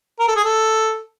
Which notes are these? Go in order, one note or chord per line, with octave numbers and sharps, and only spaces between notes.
A#4
A4
G#4
A4